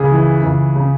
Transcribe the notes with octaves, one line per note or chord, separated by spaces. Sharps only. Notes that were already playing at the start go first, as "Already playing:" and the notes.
Already playing: C#2 G#4
E3
C#2
C#3